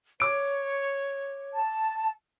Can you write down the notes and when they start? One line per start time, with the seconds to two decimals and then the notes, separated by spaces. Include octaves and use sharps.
0.20 C#5 D6 D7
1.53 A5